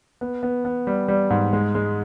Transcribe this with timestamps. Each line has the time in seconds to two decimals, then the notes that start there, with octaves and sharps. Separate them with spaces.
0.21 B3
0.43 B3
0.65 B3
0.87 G3
1.08 G3
1.30 G#2
1.53 G#3
1.75 G#3